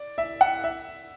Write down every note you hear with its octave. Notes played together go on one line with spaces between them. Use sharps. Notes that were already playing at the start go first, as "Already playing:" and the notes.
Already playing: D5
E5
F#5
E5